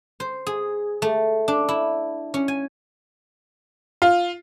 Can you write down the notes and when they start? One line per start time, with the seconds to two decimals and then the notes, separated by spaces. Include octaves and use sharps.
0.20 C5
0.47 G#4
1.02 A3
1.48 D4
1.69 E4
2.34 C#4
2.48 G#5
4.02 F4